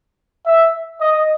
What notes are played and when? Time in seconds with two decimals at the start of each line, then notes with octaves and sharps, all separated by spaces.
0.46 E5
1.01 D#5